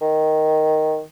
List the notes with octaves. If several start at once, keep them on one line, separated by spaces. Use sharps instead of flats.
D#3